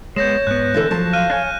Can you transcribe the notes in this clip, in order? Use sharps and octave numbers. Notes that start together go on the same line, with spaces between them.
G#3 A#3 B3 C#5 G6 A#6 E7
G#2 B3 F#6
D3 E3 A4
F3 F#3 C5 A5
F5 F6 F#6 D#7
D4 C#5 G#5 F#6